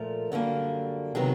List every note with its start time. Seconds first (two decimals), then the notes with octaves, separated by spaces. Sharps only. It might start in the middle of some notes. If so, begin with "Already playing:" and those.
Already playing: A#2 F3 A3 A#4
0.32 F#2 D3 G3 A#3
1.15 C3 D#3 F#3 B3 G#4